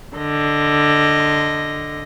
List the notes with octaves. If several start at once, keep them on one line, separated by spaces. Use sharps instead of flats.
D3 D#5